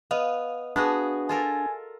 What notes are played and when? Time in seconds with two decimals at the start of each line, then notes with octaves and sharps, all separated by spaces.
0.11 B3 D#5 F5
0.76 B3 D4 F#4 G#4
1.29 F4 A4 A#4 G#5